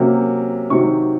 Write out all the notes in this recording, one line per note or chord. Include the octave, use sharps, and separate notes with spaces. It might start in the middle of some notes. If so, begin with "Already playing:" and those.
Already playing: C3 F#3 A#3 C#4
C3 D#3 F#3 C#6